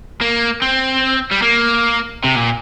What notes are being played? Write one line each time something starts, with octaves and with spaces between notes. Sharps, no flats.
A#3
C4
G3
A#3
C3
A#2